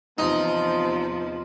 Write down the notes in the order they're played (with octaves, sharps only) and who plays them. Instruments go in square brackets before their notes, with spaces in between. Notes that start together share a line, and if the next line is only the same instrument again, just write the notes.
[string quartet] E2 C3 F3 [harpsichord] D#4